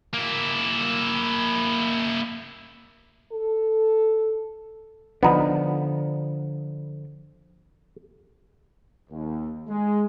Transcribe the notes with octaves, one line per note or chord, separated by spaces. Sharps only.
A#3 E4
A4
D3 F3 B3 D4 D#4
D#2
G#3